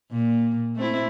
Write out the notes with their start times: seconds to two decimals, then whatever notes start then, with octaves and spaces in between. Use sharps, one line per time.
0.11 A#2
0.76 A3 C4 E4